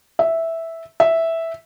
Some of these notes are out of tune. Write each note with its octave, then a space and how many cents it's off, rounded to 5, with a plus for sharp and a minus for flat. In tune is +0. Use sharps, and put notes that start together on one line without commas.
E5 -5
E5 -5